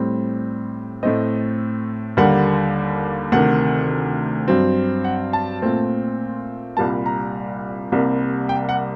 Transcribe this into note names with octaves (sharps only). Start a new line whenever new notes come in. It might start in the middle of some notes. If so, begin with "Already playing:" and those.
Already playing: A2 G3 C4
A2 A3 C4 D#5
D#2 D3 G3 A#3 F#5
D2 C3 D#3 F#5
G2 F#3 C4
F#5
A5
A#2 A3 C4
C2 A#2 G3 A#3 A5
A#5
C2 C3 G3 A#3
G5
F#5